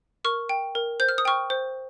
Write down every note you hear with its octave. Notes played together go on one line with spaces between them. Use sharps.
A#4 C#6 F6
G5
A#4
C5 G6
F6
D#6
G5 C#6 F6
C5